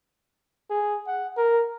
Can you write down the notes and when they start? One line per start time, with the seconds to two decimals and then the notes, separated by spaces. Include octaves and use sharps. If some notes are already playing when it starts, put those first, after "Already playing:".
0.70 G#4
1.07 F#5
1.37 A#4